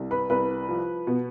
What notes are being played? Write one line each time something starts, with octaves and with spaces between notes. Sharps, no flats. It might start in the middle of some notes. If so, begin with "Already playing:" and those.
Already playing: C2
B4 B5
C2 B4 B5
F3
B2